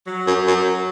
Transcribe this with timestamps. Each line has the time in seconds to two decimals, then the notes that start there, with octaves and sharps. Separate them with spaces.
0.07 F#3
0.27 F#2
0.47 F#2